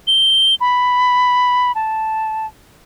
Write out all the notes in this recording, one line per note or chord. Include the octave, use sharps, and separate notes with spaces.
G7
B5
A5